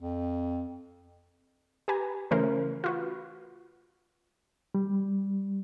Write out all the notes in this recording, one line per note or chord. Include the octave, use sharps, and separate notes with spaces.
F2
G4 B4 G#5 A#5
C#3 E3 A3 C#4 A#4 C5
F4 F#4 B4
G3